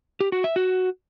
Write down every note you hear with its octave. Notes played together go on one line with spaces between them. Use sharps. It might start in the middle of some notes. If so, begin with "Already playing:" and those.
G4
F#4
E5
F#4